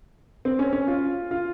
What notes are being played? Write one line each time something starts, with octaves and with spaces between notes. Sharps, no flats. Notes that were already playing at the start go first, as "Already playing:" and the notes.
C4
C#4
C#4
F4
F4